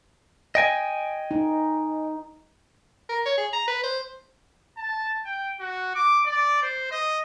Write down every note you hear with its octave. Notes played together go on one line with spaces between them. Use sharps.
D#5 G5 G#5
D#4
A#4
C#5
G#4
A#5
B4
C5
A5
G5
F#4
D6
D5
C5
D#5